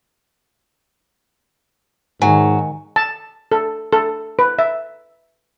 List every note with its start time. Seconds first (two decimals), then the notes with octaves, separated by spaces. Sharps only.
2.22 G#2 D#3 F#3 G#5
2.96 A5
3.52 A4
3.92 A4
4.39 B4
4.59 E5